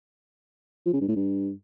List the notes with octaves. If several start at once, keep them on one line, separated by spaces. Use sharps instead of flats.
F3
C#3
G2
A2
G2